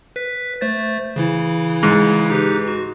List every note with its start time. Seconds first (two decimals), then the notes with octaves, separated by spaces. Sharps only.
0.16 B4 B6
0.61 A3 C5 A6
1.16 C#3 E3 E4
1.83 G#2
2.30 D#4 G4 B4
2.68 F#4